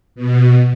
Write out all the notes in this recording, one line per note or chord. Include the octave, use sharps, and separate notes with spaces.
B2